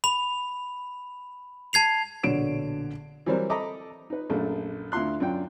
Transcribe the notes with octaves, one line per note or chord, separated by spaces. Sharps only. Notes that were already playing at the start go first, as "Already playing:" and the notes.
B5 F7
A5 G#6 C7 F7
A#1 B2 D3 C#5 D7 E7
E3 F#3 G3 C4 A#4 C5
A4 D#5 A#5 B5 D6
D#4 B4
A#1 F#2 A3
D2 E4 F4 C6 F#6
F#2 D4 F4 G5